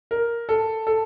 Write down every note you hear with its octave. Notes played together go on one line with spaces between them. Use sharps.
A#4
A4
A4